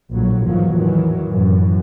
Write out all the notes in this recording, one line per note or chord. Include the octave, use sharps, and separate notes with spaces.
A#1 A2 F#3
E2 G#2 D#3 F3 F#3
A2 D#3 E3 F#3
F#2 A2 E3